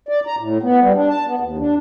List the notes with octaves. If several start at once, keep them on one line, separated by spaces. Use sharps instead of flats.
D5
A#5
A2
B3
G3
D4
A5
B3
D#2
D4